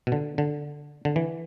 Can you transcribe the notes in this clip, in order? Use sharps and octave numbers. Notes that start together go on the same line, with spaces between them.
B2
D3
D3
D3
E3